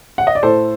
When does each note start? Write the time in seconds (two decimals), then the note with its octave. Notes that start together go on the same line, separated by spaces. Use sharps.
0.18 F#5
0.27 D#5
0.35 D5
0.43 A2 A4 C5